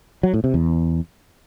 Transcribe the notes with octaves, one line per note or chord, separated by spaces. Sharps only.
F#3
A2
C3
E2